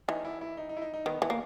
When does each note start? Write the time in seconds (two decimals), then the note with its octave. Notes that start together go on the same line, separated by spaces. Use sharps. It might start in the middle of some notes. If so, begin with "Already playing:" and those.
0.08 E3 D#4
0.24 E4
0.41 E4
0.57 D#4
0.69 D#4
0.77 E4
0.82 D#4
0.94 D#4
1.06 D#3 B3
1.22 E3 B3
1.30 A#3